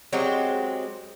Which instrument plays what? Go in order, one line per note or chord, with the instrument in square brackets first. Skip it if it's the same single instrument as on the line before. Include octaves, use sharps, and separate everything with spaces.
[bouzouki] F#3 G#3 C4 G4